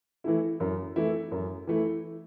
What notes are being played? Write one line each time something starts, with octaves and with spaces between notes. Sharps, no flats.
E3 A3 E4
F#2
E3 A3 E4
F#2
E3 A3 E4